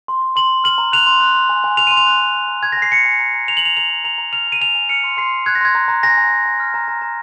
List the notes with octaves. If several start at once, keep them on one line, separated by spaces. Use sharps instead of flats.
C6
C6
C6 F#7
C6
F6 F#7
A#5
F#6 F7
C6
F#6
C6
G#5
G#5
F6 F7
C6 D#7
F7
F#6
C6
A#5
A#5
G#5 G#6
A#6
G#5
C7
G#5 C#7
G#5
A#5
A#5
A#5 F7
F#7
A#5 F7
A#5 F7
A#5
A#5 F7
A#5
F6 F7
A#5
D#7
G#5 F7
G#5
F6 C#7
C6
C6 C7
C6
F#6 G#6
A#6
C6 G#6
A#5
A#5
G#5 A#6
G#5
A#5
A#5
F6
A#5
A#5
A#5